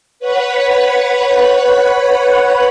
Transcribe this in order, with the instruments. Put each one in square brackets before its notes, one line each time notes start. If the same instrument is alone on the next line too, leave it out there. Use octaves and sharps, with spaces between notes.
[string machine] B4 C#5 F#5 B5